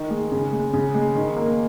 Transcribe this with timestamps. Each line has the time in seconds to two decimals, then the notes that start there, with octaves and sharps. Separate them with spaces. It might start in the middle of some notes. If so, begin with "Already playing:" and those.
Already playing: D#3
0.10 G#3
0.32 C#3
0.52 G#3
0.73 C#3
0.94 G#3
1.15 D#3
1.36 A#3